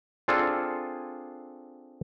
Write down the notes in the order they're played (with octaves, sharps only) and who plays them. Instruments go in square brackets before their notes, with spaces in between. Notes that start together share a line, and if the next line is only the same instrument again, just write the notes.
[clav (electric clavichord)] C4 D4 F4 G#4 A4